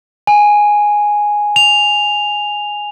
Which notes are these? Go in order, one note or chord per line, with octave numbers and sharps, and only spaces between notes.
G#5
F7